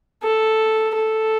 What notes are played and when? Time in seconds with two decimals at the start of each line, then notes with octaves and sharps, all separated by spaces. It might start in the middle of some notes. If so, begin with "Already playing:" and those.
0.23 A4
0.96 A4